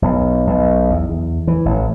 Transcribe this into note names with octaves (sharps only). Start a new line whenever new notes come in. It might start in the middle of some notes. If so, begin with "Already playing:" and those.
B1
B1
E2
E2
E3
A1